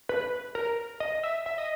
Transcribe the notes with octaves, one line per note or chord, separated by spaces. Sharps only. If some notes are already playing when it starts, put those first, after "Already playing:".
B4
A#4
D#5
E5
E5
D#5